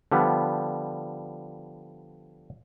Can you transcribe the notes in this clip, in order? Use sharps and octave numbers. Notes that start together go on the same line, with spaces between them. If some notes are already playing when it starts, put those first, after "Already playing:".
D3 F3 G3 B3